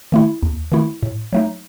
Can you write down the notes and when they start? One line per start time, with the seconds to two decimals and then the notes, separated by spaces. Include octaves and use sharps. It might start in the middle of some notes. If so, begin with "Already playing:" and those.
0.12 D#3 A3 E4
0.43 D#2
0.72 D#3 A3 E4
1.03 A2
1.33 F#3 A3 D#4